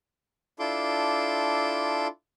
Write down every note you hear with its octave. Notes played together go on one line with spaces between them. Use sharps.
D4 E4 F4 A4 C6 D6